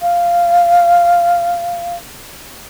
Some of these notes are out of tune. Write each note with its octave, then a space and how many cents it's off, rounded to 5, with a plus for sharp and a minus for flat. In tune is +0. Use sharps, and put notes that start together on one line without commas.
F5 -10